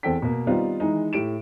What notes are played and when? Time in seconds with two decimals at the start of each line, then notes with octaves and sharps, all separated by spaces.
0.03 E2 C4 A4 G5 B6
0.22 B2 A#3
0.47 D#3 G3 B3 C4 D#4 F4
0.80 D#3 E3 G#3 D#4
1.13 A2 G4 D7 E7